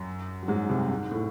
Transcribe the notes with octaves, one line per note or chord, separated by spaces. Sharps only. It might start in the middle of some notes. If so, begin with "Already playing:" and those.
Already playing: F#2 F#3
F#3
G#2 G#3
C2 C3
G#2
A2